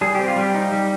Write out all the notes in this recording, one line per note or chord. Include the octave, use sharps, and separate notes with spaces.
G3 G#4
C4 G4
F4
G3 G4
D#4
G3